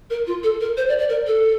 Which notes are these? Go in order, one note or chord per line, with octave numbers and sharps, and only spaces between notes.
A#4
F4
A4
A#4
C5
D5
D5
A#4
A4